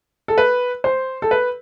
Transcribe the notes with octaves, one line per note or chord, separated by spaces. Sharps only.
A4
B4
C5
A4
B4